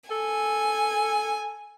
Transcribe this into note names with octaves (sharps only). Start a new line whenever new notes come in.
A4 G#5